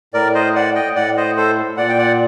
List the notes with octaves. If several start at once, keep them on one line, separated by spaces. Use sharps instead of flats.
A2 A#4 D5
C5 D#5
D5 F#5
D#5 G5
A2 D5 F#5
C5 D#5
A4 C5
A#2 D5 F#5
G5
D5 F#5